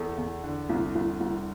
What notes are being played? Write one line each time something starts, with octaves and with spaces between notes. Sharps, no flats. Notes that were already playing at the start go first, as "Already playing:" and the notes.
Already playing: E2 A4
E2
D3
C2
C2
C2